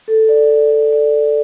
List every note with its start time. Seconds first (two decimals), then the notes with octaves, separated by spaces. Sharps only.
0.08 A4
0.29 D5
0.50 D5
0.71 D5
0.92 D5